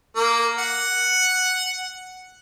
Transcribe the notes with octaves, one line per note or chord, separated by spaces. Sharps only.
A#3
F#5